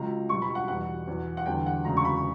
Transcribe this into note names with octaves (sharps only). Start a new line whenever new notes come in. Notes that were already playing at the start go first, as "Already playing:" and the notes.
Already playing: C#2 C#3 F#3 A#5
B1 B2 G3 C#6
B5
F#5
E2 B2 G3 F#5
E2 B2 F#3
F#5
E2 D3 G3 G5
F#5
E1 D2 C#3 A#5
C#6
B5